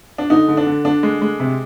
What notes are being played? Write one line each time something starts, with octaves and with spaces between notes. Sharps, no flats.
D4
D3 D#4
D3
D4
D3
D3 D4
G#3
G#3
C3